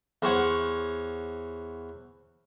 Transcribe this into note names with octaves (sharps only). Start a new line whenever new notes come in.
E2 C5 C#5 F#5